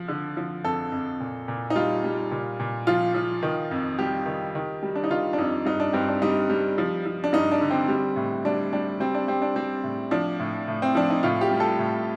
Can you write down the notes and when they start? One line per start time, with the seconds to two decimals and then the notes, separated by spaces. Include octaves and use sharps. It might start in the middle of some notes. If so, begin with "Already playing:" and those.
Already playing: F3
0.08 D3
0.37 F3
0.64 F2 A4
0.92 F2
1.21 A#2
1.48 A#2
1.70 D#4
1.75 G3 F4
2.04 G3
2.31 A#2
2.60 A#2
2.87 F3 F4
3.14 F3
3.43 D#3
3.71 F2
3.99 G3 G4
4.26 D#3
4.55 D#3
4.83 G3
4.95 D4
5.04 D#4
5.10 D#3 F4
5.33 D4
5.38 F2 D#4
5.65 G2 D#4
5.80 D4
5.93 G2 C4
6.08 D4
6.22 G3 D#4
6.49 G3
6.78 F3
7.06 F3
7.24 D4
7.33 G2 D#4
7.52 D4
7.61 D3
7.70 C4
7.88 G3
8.16 A2
8.45 G3 D4
8.73 G3 D4
9.00 G3 C4
9.15 D4
9.28 G3 C4
9.42 D4
9.56 G3 C4
9.84 A2
10.11 F3 D4
10.40 A2
10.68 A2
10.82 C4
10.95 F3 D4
11.10 D#4
11.23 A2 F4
11.41 G4
11.51 G3
11.60 A4
11.79 A2